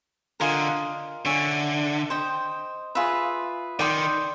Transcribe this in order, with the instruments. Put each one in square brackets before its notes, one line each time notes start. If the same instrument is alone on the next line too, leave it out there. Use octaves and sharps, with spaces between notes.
[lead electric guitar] D3 [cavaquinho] F4 A#4 D#5 G#5
[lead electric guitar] D3 [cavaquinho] C#5 E5 G#5
[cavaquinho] C5 D#5 G5
F4 G#4 B4 E5
[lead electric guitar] D#3 [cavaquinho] D5 G5 C6 D#6